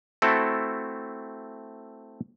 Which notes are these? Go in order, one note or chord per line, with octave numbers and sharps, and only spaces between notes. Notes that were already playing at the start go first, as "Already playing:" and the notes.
A3 C4 E4 F#4 A4